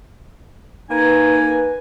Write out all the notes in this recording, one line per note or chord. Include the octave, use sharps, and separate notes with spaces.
A#3 D#4 B4 G#5